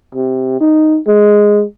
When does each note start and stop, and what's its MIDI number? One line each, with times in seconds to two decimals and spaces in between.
0.15 0.60 48
0.60 0.98 63
1.08 1.63 56